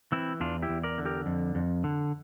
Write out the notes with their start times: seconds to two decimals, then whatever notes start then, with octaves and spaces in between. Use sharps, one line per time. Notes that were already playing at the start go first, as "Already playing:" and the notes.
0.12 E3 C4 E4
0.40 E2 D4 F4
0.62 E4 G4
0.69 E2
0.83 A#4 D5
0.98 D3
1.05 G4 A#4
1.26 F2
1.55 F2
1.84 D3